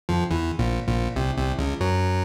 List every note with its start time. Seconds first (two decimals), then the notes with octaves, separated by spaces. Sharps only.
0.09 F2 F3
0.31 E2 E3
0.59 A#1 A#2
0.88 A#1 A#2
1.16 C2 C3
1.38 C2 C3
1.59 C#2 C#3
1.81 F#2 F#3